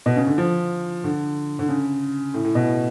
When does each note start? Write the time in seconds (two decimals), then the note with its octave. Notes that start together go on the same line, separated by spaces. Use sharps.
0.06 B2
0.16 C#3
0.27 D3
0.38 F3
1.04 D3
1.59 D3
1.69 C#3
2.34 A2
2.44 A2
2.55 B2